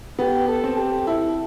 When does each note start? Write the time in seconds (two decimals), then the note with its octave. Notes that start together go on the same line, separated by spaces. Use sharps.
0.19 B3 G4
0.48 A4
0.64 C4
0.77 G4
1.07 E4 A4